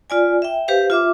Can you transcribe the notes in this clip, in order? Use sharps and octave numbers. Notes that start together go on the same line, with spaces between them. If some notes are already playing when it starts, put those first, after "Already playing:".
F4 D5 G#5
E5 G5
G4 B4 C5 F5
F4 E5 D6